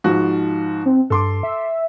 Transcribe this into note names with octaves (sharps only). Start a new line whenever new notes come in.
G#2 F3 F#4
C4
G2 A4 C6 D6
E5